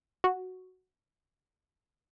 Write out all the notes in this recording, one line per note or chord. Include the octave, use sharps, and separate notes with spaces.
F#4